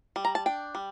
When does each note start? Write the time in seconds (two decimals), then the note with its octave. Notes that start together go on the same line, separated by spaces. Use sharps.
0.16 G3
0.25 A#5
0.35 A5
0.46 D4 G5
0.75 G3